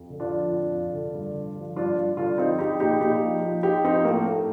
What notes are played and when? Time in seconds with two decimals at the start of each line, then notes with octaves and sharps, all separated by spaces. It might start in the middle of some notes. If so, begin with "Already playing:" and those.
Already playing: F2
0.10 D3
0.20 D4 F4
0.31 F3
0.51 F2
0.73 F2
0.93 D3
1.14 G2
1.34 D3
1.56 F3
1.76 G2 D4 F4
1.97 G2
2.17 D3 D4 F4
2.38 F3 C4 D#4
2.59 F3 D#4 G4
2.80 A#2 D#4 G4
3.01 A#2 D#4 G4
3.21 F3
3.42 F3
3.63 F3 D#4 G4
3.84 F3 C4 D#4
4.04 A2 A#3
4.26 A2 A3